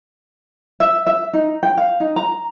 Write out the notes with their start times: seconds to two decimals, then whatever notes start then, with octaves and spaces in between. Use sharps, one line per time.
0.80 E5
1.07 E5
1.33 D#4
1.63 G5
1.77 F5
2.00 D#4
2.16 A#5